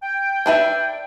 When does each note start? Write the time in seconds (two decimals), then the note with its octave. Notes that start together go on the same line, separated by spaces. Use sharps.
0.03 G5
0.46 D4 B4 E5